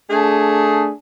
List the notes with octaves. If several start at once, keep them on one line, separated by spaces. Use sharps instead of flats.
A3 D4 G#4